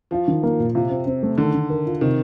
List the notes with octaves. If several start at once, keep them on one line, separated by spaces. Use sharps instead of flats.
F3 F4
D#3
A#3
A#2
C3 F4
C4
C4
A3
D3 D#3
D#3
A#4
F4
C3 D#3